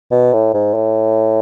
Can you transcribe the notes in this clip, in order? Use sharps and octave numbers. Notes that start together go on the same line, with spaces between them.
B2
A2
G#2
A2